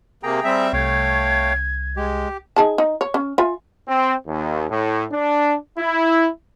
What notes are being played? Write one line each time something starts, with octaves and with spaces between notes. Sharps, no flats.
C3 A#3 G#4 G5 A#5
G3 C4 E5
C2 A3 C#5 F5 G5 G#6
G#3 G4
D#4 G#4 A5
D#4
C#5
C#4
F4 E5 G#5
C4
D#2
A2
D4
E4